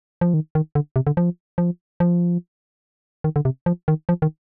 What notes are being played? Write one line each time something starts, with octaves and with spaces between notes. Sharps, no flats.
F3
D#3
D#3
D3
C3
D3
F3
F3
F3
D#3
D3
C3
F3
D#3
F3
D#3